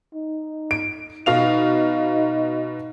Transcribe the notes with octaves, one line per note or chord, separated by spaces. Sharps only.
D#4
D7
B2 D#4 F5 F7